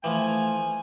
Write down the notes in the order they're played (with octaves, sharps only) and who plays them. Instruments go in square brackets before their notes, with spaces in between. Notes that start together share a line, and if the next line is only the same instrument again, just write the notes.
[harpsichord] E3 F3 [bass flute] A3 [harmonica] G#5